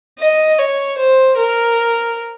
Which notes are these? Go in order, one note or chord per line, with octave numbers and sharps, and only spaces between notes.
D#5
C#5
C5
A#4